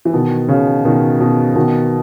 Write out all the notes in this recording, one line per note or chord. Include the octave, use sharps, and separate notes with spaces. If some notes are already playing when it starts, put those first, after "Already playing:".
E3
B2 D#3
C#3
B2 D#3
B2
B2 D#3